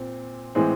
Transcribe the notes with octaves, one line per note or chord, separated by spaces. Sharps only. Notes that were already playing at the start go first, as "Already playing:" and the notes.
Already playing: A#2 C4
A2 E3 G#3 C4